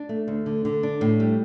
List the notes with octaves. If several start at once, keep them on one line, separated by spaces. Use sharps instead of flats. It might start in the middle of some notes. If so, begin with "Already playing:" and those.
Already playing: D4
A3
D2
D3
D3
D4
A2
G3